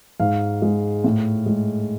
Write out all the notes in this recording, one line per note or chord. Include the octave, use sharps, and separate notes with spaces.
G#2 F5
G#3
A2
G#3